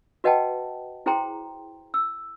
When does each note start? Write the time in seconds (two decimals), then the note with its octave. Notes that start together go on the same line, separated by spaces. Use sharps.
0.24 F#4 B4 D#5 F#5 G5 A5
1.06 E4 G#4 C5 G5 A#5 C6
1.94 E6